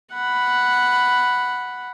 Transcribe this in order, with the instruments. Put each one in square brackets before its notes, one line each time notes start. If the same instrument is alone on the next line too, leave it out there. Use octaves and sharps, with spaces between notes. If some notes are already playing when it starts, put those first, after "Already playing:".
[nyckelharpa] F#5 B5